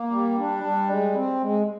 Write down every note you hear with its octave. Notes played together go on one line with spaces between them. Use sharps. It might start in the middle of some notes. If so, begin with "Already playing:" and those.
Already playing: A#3
G3
D4
G3
G#3
C4
G#3